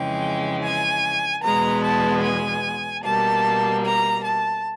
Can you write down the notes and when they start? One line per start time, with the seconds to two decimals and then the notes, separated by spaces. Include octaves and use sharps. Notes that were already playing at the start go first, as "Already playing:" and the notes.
Already playing: F2 C#3 E3 G#3 G5
0.63 G#5
1.43 E2 B2 G#3 B3 A#5
1.84 A5
2.23 G#5
3.04 B2 G3 A#3 A5
3.85 A#5
4.25 A5